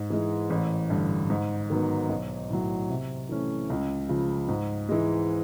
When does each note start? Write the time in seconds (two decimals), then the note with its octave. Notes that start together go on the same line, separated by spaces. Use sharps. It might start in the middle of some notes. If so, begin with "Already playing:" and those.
Already playing: G#2
0.10 E3 G#3
0.50 A1
0.90 G2 D3
1.30 G#2
1.70 D#3 F#3 B3
2.09 B1
2.50 A2 F#3
2.90 C3
3.29 E3 A3 C#4
3.70 C#2
4.09 C#3 F3
4.48 G#2
4.89 E3 G#3